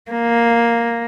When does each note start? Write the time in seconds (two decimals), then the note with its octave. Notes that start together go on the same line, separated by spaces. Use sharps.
0.11 A#3